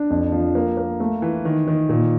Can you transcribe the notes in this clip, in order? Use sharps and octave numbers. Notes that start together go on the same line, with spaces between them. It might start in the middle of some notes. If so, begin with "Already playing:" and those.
Already playing: D4
F2
F3
A#3
A#3
A3
E3
D#3
D#3
A#2